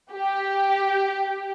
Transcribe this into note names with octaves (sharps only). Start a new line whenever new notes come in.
G4